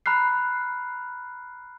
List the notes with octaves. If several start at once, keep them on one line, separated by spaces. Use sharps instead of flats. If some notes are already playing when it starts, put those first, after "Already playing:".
A#5 B5 F6 F#6 C7